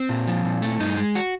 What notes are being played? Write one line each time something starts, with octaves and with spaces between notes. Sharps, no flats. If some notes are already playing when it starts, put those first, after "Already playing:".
Already playing: C4
A#2
F3
A#2
A3
G2 D#4
G#3
F#4